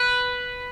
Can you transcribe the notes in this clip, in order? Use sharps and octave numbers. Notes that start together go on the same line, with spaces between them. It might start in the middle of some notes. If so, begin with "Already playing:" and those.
Already playing: B4